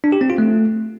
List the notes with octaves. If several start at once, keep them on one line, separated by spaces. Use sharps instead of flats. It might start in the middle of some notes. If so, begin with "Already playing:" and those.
D4
G4
C4
F4
A3